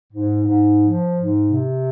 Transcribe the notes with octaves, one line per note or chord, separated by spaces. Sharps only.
G#2
G#2
F3
G#2
C3